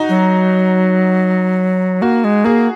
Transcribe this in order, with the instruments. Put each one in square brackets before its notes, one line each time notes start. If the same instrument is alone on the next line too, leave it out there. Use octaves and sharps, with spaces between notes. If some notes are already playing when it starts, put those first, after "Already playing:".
Already playing: [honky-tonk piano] D#4 F#4
[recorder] F#3
[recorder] A#3 [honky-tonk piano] F#4
[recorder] G#3
[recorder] A#3 [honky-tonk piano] G#4